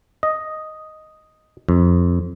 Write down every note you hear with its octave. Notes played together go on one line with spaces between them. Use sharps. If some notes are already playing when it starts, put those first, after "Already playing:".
D#5
F2